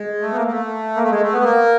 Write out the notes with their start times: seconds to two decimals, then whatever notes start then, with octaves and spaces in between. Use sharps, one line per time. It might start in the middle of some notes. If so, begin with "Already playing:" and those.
Already playing: G#3
0.22 A3
0.32 B3
0.37 A#3
0.47 A#3
0.51 A3
0.96 A#3
1.03 A3
1.10 G#3
1.22 A3
1.33 B3
1.44 A#3